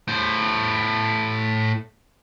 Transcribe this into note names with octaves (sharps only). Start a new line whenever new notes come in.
A2 C5